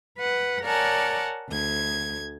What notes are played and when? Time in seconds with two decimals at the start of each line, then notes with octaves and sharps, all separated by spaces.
0.19 B4 F#5
0.64 A#4 C#5 D5 F#5 G#5 A5
1.51 D2 G#6